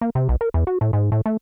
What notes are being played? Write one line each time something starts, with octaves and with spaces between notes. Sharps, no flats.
A#3
C3
B1
A#4
E2
F#4
A2
G#2
A2
A3